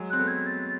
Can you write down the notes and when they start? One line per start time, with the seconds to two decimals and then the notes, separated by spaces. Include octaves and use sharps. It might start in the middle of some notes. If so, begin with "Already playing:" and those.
Already playing: F#3 G#3
0.10 C4 F#6
0.19 A3 B3
0.28 G#6
0.46 A6